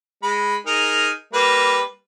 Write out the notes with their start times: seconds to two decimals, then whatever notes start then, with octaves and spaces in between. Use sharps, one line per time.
0.23 G#3 B5
0.66 D#4 G#4 A#4
1.33 G3 A#3 B4